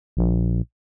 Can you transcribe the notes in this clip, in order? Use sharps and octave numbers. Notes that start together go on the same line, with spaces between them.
A#1